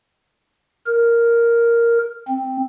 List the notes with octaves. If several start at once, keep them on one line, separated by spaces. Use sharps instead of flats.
A#4
C4